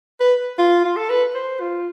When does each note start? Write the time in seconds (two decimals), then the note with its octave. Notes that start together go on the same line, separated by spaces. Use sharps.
0.20 B4
0.58 F4
0.84 F4
0.97 A4
1.09 B4
1.35 C5
1.60 F4